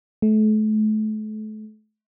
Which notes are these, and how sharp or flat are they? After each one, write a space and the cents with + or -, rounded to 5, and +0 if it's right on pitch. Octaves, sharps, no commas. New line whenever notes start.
A3 -35